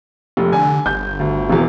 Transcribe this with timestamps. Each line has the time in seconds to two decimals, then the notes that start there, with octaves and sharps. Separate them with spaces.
0.37 F1
0.52 D3 G#5
0.86 G1 G6
1.20 D2
1.49 E1 E2